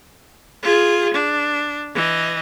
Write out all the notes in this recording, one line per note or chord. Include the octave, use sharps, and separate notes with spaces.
F4 G#4
D4
E3 D#5